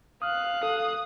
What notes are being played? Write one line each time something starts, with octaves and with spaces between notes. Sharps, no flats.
F5 D#6 F6 F#6
A4 D#6